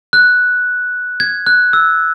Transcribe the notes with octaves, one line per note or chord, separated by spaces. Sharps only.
F#6
G#6
F#6
E6